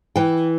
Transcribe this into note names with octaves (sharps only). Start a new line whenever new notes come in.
E3 G5